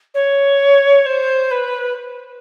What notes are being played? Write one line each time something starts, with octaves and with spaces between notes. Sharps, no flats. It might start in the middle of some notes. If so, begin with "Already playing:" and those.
C#5
C5
B4